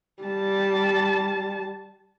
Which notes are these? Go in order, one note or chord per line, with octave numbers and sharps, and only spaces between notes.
G3 A5